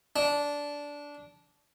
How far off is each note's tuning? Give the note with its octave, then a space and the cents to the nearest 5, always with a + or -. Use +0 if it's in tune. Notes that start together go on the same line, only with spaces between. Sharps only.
D4 -15